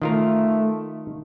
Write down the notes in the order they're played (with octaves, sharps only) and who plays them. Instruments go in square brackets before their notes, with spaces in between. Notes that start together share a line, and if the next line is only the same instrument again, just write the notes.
[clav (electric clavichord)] D#3 F4 A#4 [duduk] A3